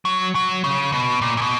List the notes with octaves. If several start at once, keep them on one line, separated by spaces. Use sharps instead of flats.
F#3
F#3
C#3
B2
A#2
A#2
B2